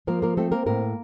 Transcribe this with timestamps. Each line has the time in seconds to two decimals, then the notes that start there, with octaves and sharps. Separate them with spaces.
0.07 F3 A#3 A#4
0.22 A#3 A#4
0.37 A3 C4 A4
0.52 A#3 A#4
0.66 A2 A#3 A#4